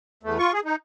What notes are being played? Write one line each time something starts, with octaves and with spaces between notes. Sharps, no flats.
E2 A3
F4 C#6
G#4
D#4